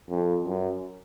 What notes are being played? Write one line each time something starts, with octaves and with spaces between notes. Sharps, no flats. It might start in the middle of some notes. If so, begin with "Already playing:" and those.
F2
F#2